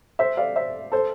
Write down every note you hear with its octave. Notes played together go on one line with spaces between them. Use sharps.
C5 E5
D5 F5
C5 E5
A4 C5